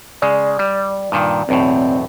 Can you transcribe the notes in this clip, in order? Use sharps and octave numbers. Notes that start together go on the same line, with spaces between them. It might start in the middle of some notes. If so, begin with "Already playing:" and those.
C#3 G#3 D5
G3
G2 A#2 D#3
B1 E2 A2 C4